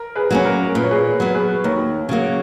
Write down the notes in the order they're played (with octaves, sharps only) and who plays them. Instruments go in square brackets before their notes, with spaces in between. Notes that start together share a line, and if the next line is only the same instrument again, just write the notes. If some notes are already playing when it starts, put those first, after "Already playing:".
Already playing: [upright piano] A#4
G#4 B4
[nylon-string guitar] F#3 A#3 C#4
[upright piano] A#4
[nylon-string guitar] A#2 [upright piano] B4
[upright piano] C#5
G#4 B4
[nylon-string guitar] F#3 B3
[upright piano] G#4 B4
[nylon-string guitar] D#2 [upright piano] A#4 C#5
[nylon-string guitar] C#3 F#3 A#3